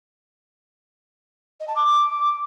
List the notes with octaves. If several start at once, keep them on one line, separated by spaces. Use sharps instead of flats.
D#5
A5
D6